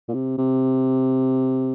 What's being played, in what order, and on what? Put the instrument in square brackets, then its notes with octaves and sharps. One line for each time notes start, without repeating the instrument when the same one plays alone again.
[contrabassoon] A#2
C3
C3